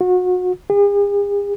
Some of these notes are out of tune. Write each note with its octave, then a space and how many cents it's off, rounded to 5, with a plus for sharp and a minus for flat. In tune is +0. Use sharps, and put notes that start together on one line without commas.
F#4 -30
G#4 -45